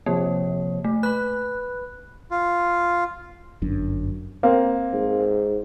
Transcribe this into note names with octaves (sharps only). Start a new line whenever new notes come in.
C3 F3 A#3 C#5
A3
B4 B5 F#6
F4
G1 F#2 D4
A#3 C4
G#2